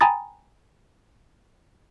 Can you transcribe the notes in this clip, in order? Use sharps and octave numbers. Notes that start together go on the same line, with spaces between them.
G5 G#5 A#5 B5 D#6 A6